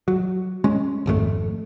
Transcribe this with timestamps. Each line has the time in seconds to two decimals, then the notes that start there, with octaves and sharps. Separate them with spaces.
0.08 F#3
0.64 G#3 C#4
1.06 G#1 F2 B2 A3